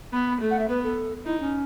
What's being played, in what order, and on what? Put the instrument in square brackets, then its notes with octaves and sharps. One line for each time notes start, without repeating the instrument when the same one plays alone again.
[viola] B3 [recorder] B5
[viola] A3
[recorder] F#5
E5
[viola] B3 [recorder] B4
[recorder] A4
[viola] D#4 [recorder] E4
[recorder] C#4